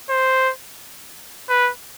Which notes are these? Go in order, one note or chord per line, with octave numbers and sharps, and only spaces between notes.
C5
B4